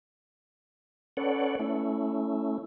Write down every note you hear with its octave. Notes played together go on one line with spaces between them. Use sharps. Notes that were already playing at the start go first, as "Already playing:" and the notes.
C#4 A4 B4 C#5 D5 F#5
A3 C#4 E4